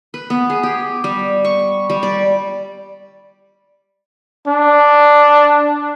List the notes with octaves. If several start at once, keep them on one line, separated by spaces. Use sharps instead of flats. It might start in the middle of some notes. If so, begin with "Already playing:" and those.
B4
B3
G#4
G4
G3
C#6
G3
D5
D4